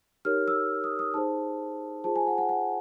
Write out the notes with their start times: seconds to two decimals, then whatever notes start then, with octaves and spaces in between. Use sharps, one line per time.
0.25 D#4 G4 A#4 C#5 F6
0.48 E6
0.84 D#6
0.99 D#6
1.14 D#4 G#4 C5 A5
2.04 F4 G#4 C5 A5
2.16 G#5
2.27 F#5
2.38 F#5
2.49 F#5